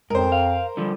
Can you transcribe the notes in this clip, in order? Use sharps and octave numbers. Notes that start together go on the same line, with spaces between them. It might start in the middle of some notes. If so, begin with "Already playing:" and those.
F2 G#2 A#4 C5
F5
D3 F3 G3